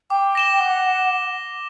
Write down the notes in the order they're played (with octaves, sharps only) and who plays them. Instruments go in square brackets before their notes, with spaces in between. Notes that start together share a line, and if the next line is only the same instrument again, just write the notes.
[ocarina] G5 [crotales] D6
[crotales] A#6 E7 G7
[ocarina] F#5 [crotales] D6